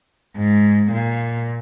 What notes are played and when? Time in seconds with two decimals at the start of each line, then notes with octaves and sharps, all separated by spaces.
0.37 G#2
0.92 A#2